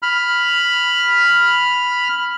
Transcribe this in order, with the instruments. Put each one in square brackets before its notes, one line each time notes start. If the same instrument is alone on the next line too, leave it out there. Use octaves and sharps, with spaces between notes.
[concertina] B5 F6